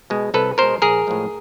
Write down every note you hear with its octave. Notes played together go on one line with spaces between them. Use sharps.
B2 G#3
C2 A4 B4
B2 G#3 A#4 C5
A#1 G#4 A#4
A2 F3 G#3